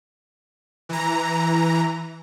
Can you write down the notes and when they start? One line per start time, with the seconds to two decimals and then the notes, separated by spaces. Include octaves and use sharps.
0.89 E3 A#5